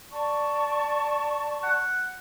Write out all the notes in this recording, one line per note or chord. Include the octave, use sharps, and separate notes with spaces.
D5 A5 C#6
F#5